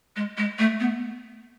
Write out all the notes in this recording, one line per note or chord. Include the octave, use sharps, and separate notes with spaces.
G#3
G#3
A3
B3